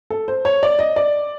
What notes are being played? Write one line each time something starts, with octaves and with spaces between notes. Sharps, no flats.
A4
C5
C#5
D5
D#5
D5